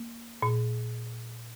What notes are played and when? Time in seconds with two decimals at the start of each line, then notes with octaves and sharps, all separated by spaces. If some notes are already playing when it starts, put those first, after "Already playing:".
Already playing: A#3
0.42 A#2